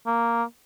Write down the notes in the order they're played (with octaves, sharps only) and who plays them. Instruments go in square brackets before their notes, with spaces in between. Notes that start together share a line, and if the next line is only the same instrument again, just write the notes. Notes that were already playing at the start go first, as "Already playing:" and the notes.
[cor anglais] A#3